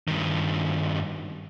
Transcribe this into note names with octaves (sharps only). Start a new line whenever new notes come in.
G2 D#3